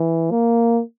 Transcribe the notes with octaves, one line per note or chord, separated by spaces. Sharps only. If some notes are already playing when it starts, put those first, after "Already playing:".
Already playing: E3
A#3